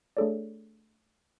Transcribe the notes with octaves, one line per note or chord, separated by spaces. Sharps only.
A3 D4 G#4 A4 C#5 D5